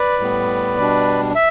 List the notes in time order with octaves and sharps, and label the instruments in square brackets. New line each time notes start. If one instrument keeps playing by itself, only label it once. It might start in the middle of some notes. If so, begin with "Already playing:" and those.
Already playing: [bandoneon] B4 D5
A2 G3 B3
B2 G3 D4
E5